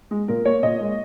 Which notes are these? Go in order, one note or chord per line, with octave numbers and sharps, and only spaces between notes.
G#3
A#2 A#4
A#3 C#5
A#2 D#5
G#3